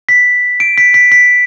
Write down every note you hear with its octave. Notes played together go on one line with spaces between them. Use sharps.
B6
D7
B6
B6
B6